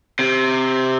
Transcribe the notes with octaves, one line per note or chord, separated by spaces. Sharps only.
C3